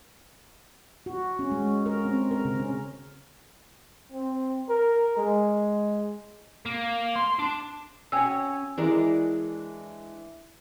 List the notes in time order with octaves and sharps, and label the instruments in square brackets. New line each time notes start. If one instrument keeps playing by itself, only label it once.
[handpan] F#4
C#4
G#3
A#4
C4
A#4
C#3
C#4
[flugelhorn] C4
A#4
G#3
[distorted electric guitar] A#3
C6
D4
[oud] C#4 F#4 [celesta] G5 G#5 E6
[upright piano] E3 [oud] G#3 D4 A#4